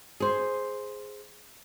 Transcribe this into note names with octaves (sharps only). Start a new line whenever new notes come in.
G#4 C5